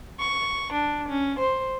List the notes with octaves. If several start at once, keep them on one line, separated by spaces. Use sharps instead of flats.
C#6
D4
C#4
C5